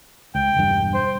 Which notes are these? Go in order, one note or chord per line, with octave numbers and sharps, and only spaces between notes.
C#2 G5
E1 G2
C5